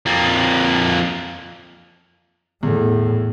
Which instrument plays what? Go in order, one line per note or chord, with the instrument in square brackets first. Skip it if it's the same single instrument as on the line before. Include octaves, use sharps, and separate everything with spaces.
[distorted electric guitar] F2 A#3
[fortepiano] E2 A3 [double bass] A2